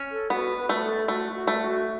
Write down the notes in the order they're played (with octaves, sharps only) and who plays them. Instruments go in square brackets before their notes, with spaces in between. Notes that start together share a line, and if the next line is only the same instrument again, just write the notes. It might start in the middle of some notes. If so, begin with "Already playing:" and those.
Already playing: [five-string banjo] C#4
[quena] A4
[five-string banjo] B3 [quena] F#4
[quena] B4
[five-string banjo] A3
[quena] A4
[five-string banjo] A3 [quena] F#4
[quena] E4
F#4
[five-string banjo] A3
[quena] F#4